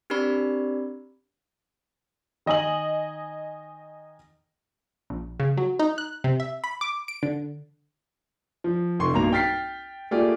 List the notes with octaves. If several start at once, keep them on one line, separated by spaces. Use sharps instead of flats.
C4 D4 G4 A#4 D5 B5
D#3 D#5 G#5 D#6 F#7
A#1
C#3
F#3
D#4
F#6
C3
E5
B5
D6
D7
D3
F3
F1 C6 C#6
B1 G2 A#3 A#5 F7
G5 F6 A6 B6 C7
A3 A#3 F4 G4 G#4 D5